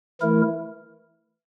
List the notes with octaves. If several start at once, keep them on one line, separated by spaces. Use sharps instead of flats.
E3 A3 E4 A#4